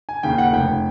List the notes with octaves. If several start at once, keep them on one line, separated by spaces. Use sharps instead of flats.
G#5
D#2 C#3 G5
F#5
F1 G5